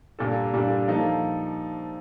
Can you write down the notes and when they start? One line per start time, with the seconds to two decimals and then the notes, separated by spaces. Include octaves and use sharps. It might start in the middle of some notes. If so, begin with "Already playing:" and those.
0.19 A#2 G3 A#3 D4 A4
0.54 A#2 G3 A#3 D4 A4
0.88 F3 A#3 D#4 A4